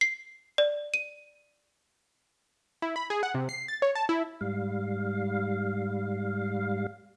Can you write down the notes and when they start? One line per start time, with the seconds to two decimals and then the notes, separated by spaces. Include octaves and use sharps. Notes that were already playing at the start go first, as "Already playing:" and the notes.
0.01 C7
0.58 D5
0.94 D#7
2.82 E4
2.96 B5
3.10 G#4
3.23 F#5
3.35 C3
3.49 C7
3.68 A6
3.82 C#5
3.95 A5
4.09 E4
4.41 G#2 G3 F5